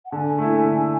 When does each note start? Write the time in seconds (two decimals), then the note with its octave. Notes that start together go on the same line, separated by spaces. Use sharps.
0.06 F#5
0.12 D3 G#5 A5
0.38 A3 E4
0.64 D3